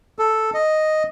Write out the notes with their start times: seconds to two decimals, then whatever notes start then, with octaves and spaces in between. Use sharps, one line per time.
0.19 A4
0.54 D#5